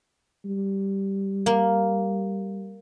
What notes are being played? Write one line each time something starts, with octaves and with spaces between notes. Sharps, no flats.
G3
A#3